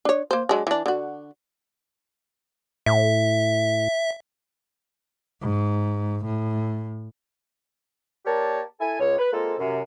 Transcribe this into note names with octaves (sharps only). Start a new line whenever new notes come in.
D4 C#5
A#3 C5
F#3 G#3 D4
E3 D4
D3 F#4
A2 E5
G#2
A2
A#3 G4 A#4 C#5 D5 A5
E4 A4 G#5
C#2 C#5
B4
G#3 A#3 C4 F4 A4
F#2 C3